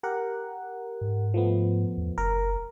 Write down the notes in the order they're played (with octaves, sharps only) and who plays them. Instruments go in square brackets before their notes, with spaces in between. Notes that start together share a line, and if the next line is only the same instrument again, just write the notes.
[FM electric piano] G4 A#4 F#5
[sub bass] G#2
[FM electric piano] F3 A3 B3
[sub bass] E2
[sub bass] F#1 [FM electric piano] A#4